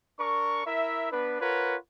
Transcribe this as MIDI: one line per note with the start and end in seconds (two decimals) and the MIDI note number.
0.19 0.62 62
0.19 0.62 70
0.19 0.62 85
0.66 1.09 64
0.66 1.09 70
0.66 1.09 76
1.12 1.39 59
1.12 1.39 62
1.12 1.39 71
1.41 1.75 65
1.41 1.75 70
1.41 1.75 71
1.41 1.75 73
1.41 1.75 78